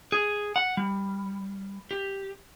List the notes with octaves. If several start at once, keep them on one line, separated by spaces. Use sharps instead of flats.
G#4
F#5
G3
G4